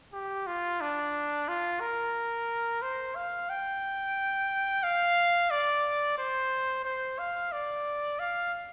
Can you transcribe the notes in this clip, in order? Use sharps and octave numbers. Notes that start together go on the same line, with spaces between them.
G4
F4
D4
F4
A#4
C5
F5
G5
F5
D5
C5
C5
F5
D5
F5